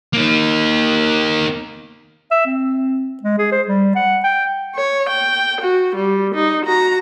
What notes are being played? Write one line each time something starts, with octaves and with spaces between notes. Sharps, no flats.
A#3 D#4
E5
C4
G#3
G#4
C5
G3
F#5
G5
C#5
G5
F#4
G3
D#4
F#4 A#5